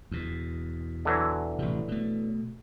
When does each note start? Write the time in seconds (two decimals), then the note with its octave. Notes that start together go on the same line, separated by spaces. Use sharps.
0.11 E2 B2
1.05 D3 E3 F#3
1.59 A1 C3
1.88 B2 A3